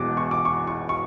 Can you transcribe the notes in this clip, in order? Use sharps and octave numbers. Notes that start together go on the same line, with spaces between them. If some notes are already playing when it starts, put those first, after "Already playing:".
Already playing: E1 E2 B2 D6
C#6
D6
C#6
C#6
C#6